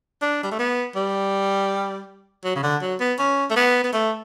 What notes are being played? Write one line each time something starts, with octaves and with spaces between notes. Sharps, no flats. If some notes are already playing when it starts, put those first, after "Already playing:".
D4
G3
A3
B3
G3
F#3
C#3
D3
F#3
B3
C#4
A3
B3
B3
A3